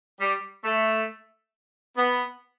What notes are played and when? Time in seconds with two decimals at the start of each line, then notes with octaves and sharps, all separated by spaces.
0.20 G3
0.64 A3
1.96 B3